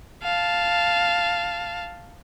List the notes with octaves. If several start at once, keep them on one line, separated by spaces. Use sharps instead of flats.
F5 A5